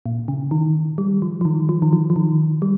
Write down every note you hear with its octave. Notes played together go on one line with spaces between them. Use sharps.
A#2
C#3
D#3
G3
F3
F3
D#3
F3
D#3
F3
F3
D#3
G3